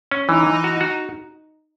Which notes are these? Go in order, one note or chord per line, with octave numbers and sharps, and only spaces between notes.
C#4
E3 D#4
E3
F#4
F#4